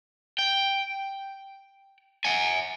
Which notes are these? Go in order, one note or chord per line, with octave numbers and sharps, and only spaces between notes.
G5
F#5 G#5